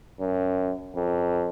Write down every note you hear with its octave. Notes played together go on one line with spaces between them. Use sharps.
F#2
F2